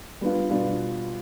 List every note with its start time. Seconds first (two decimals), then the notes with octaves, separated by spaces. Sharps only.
0.21 G3 B3 D4 F4
0.50 B2 G3 B3 D4 F4